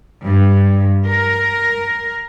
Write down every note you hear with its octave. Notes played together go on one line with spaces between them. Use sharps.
G2
A#4